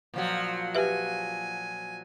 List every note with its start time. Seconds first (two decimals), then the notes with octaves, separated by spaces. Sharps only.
0.14 A#2 F3 F#3
0.75 G4 B4 E5 G#5